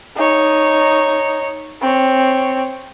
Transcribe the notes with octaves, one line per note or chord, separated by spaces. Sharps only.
D#4 C#5
C4 C#5